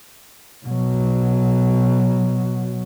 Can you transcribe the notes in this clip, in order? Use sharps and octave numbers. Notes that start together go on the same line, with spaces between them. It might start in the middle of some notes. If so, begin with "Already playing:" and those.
B2 F#3